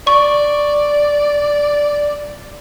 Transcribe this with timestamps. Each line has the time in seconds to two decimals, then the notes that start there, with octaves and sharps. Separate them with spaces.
0.07 D5 C#6